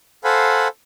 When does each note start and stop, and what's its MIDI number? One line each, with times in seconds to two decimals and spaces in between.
0.24 0.68 69
0.24 0.68 72
0.24 0.68 77
0.24 0.68 78
0.24 0.68 80
0.24 0.68 83